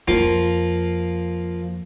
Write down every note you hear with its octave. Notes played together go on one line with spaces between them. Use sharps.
F2 F3 A#3 F4